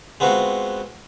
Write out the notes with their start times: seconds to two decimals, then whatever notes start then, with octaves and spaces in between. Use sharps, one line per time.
0.20 G#3 B3 C4 F4 F#4